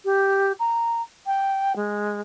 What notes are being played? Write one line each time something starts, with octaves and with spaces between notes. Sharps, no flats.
G4
A#5
G5
G#3